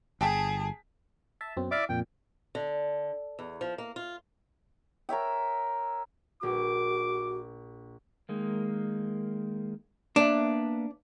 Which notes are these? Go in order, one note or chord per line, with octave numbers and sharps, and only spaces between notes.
G1 G#4 G5 A5 B6
E5 A5
F#2 B2 C4
E4 D5 E5 F5 D6
F2 A#2 G5
D3
E2
F3
A#3
F4
A#4 C#5 E5 G5
A#1 F#4 D6
D#3 G#3 A#3
A#3 B3 D4 E5